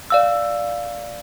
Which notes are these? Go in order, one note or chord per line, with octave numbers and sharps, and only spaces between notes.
D5 F5 E6